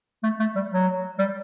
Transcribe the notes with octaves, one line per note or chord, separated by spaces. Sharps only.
A3
A3
G3
F#3
G3